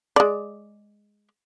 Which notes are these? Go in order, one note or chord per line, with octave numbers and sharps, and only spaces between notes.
G#3 D5